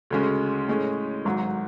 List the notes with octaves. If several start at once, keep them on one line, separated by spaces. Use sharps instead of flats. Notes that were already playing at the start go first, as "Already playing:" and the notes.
D2 C#3 G#3 C#4
A2 G#3 C#4
G#1 G#2 F#3